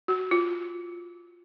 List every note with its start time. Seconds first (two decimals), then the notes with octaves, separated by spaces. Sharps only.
0.08 F#4
0.31 F4